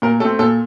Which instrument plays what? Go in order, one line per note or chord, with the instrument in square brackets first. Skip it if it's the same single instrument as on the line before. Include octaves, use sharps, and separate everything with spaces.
[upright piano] A#2 A#4
A3 C4 A4
A#2 A4